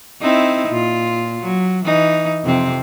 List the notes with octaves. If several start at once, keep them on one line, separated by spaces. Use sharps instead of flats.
C4 D#4 E4
A#2 F4
F#3
E3 D#4
F2 C3 C4